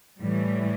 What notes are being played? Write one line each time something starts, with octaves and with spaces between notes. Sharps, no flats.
A2 E3 G3